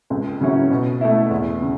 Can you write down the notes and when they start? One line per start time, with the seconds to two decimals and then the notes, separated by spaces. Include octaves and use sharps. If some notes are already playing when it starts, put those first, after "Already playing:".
0.10 C#2
0.41 C#3 F#3 C#4 E4
0.70 B2
1.01 A3 E4
1.31 E2
1.62 C#3